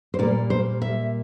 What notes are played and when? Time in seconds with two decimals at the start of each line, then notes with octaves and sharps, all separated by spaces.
0.14 C5
0.19 A#2 G3 A#3 D5
0.50 C5
0.82 E5